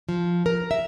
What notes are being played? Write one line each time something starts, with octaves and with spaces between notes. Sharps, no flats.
F3
A#4
E5